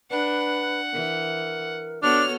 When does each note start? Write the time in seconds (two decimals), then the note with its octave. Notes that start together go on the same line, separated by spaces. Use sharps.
0.11 D4 B4 F#5
0.93 E3 A#4
2.03 B3 D4 F#4 A4 C#5 F6